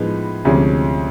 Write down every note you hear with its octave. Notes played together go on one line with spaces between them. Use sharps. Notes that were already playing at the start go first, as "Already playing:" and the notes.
Already playing: A2 F3 G#3 B3 D#4
D2 C3 F3 G#3 C#4